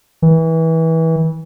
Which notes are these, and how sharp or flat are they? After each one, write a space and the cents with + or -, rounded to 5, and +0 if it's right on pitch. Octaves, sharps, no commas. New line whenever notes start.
E3 -25